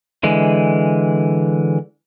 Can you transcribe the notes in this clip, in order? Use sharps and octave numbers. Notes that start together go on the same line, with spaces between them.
D3 E3 G#3